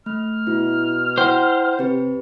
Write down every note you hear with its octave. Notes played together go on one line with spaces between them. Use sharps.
A3 F6
B2 E4
E4 C5 F#5 G5
C3 G4 B4